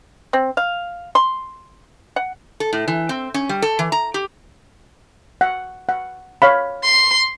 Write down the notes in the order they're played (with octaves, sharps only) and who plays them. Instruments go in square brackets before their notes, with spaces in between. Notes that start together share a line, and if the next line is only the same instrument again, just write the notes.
[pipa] C4
F5
C6
F#5
[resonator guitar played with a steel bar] A4
A2
E3
C4
C#4
G3
A4
E3
A#5
G4
[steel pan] F#5
F#5
C#5 F5 B5
[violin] C6